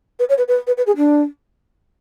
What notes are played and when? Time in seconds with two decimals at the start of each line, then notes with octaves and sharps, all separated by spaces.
0.19 B4
0.29 C#5
0.38 B4
0.48 B4
0.67 B4
0.77 B4
0.86 G#4
0.97 D4